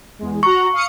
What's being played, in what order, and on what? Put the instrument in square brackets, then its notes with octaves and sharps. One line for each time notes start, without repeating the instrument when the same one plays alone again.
[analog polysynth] E2 G#3
[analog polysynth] F#4 F#5 A#5 [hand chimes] C#6
[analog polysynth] F5 D#6 C#7